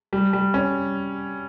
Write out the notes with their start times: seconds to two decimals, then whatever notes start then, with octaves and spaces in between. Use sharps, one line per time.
0.13 G3
0.33 G3
0.54 C#4